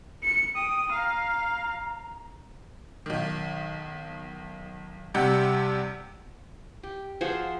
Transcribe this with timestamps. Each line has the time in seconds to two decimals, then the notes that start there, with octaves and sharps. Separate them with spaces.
0.23 C#7
0.56 G5 D#6
0.92 F5 A#5
3.06 B1 D#3
5.14 G2 C3 G4 F#5 G6
6.83 G4
7.21 F3 F#4 G#4 C5